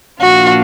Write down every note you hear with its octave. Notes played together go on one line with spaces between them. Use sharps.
A#2 F3 A#3 D4 F4 F#4